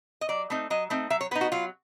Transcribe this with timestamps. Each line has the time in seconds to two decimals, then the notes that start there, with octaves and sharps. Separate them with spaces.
0.21 D#5
0.29 F#3 D5
0.50 A3 C4 D#4
0.70 F#3 D#5
0.90 A3 C4 D#4
1.10 F#3 E5
1.21 C#5
1.31 B3 B4
1.35 D#4
1.41 F#4
1.52 F#3 F4